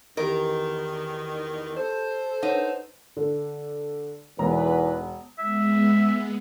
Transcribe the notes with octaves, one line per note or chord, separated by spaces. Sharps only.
E2 D#3 G4 A#4 D#5
A4 C5
D#4 B4 C#5 F#5
D3
E1 E2 B3 D#4 B4 A#5
G#3 B3 E5